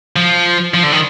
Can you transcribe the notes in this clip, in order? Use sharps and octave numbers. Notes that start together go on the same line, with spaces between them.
F3
F3
D3
D#3